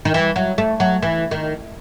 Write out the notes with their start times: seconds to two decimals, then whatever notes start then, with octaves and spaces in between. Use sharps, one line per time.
0.05 D#3
0.14 E3
0.36 F#3
0.58 A3
0.80 F#3
1.03 E3
1.31 D#3